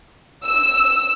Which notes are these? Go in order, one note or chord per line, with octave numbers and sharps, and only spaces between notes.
E6